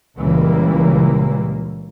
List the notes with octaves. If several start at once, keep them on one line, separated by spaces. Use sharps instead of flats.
C#2 A#2 C#3 E3 G3 A#3